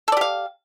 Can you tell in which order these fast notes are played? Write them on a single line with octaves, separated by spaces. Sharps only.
A4 D5 G4 F5